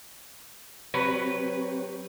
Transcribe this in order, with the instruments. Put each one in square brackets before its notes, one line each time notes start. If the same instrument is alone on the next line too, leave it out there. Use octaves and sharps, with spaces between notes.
[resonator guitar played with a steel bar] F#3 B4 [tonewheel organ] C4 G4 C#5